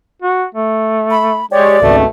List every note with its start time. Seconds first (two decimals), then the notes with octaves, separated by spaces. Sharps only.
0.22 F#4
0.55 A3
1.11 B5
1.51 G#3 G4 C#5 D5
1.81 G#1 C#2 B2 A3